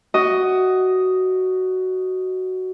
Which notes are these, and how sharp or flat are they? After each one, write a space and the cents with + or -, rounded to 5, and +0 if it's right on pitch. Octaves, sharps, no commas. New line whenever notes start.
F#4 +10 D#5 +0